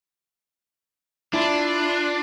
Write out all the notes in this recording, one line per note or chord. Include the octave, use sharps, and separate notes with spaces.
D4 E4 F4